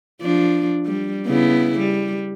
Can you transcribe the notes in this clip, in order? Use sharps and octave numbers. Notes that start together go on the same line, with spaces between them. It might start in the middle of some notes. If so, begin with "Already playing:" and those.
F3 D4
G3
C#3 B3 E4
G3